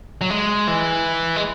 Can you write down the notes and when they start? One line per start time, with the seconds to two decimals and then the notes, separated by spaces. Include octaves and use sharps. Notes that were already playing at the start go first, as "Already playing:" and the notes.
0.21 F#3
0.30 G#3
0.68 E3
1.36 G#3